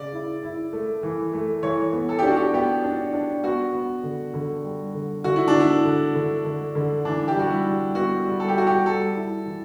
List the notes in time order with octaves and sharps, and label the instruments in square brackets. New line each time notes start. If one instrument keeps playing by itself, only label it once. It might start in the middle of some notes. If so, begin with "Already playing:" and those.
Already playing: [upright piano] C#3 [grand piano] D5
[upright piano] E4
E4
A3
E3
A3
[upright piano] E3 [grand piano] C#5
[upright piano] B3
[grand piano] A4
G4
[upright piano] D4 [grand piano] F#4
[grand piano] G4
[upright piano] B3 [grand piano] G4
[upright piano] D4
D4
[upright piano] B3 [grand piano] F#4
[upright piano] B3
D3
D3
G3
D3
[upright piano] D3 [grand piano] F#4
[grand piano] E4
D4
[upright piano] D3
[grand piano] E4
[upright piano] D3
D3
D3
D3
[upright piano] E3 [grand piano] D4
[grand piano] G4
[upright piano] G3 [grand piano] F#4
[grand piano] E4
[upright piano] G3
[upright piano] B3 [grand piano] F#4
[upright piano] G3
[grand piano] A4
G4
[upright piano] G3 [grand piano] F#4
[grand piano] G4
[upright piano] G3 [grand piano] A4
[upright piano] E4
E3